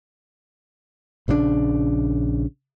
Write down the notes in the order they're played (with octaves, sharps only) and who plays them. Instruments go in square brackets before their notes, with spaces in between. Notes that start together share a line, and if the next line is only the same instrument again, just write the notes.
[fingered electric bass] A#1 C#3 E3 D4